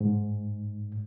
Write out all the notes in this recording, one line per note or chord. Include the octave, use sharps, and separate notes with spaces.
G#2